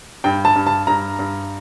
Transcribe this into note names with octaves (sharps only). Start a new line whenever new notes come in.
G2 G5
A5
G2
A5
G2 A#5
G2